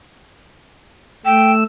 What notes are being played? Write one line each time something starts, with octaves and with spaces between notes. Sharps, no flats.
A3 G5 E6